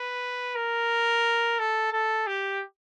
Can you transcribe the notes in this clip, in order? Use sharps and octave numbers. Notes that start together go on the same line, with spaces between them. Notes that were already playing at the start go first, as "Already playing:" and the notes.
Already playing: B4
A#4
A4
A4
G4